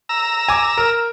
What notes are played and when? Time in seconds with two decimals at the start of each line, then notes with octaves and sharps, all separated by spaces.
0.09 A#5 E6
0.48 G#5 D6
0.78 A#4